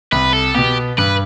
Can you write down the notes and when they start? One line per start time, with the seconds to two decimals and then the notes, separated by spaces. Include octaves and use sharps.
0.12 C2 B4
0.33 A4
0.54 B2 B3 G4
0.98 G2 B4